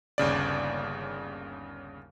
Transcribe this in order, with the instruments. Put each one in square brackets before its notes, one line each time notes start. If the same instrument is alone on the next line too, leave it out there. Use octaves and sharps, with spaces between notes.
[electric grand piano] G1 D#2 C#3 D5